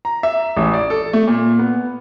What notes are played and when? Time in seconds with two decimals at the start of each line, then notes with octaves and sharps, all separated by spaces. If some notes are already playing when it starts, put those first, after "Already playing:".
0.05 A#5
0.23 E5
0.57 A1
0.74 D5
0.90 A4
1.13 A3
1.28 A#2
1.59 B3